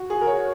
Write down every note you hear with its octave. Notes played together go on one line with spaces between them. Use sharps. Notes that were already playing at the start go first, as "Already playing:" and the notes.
Already playing: F#4
G#4
A#4
C#5